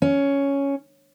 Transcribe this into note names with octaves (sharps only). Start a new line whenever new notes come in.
C#4